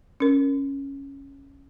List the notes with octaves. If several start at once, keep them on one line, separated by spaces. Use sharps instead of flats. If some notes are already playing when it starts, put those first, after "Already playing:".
C#4 A#4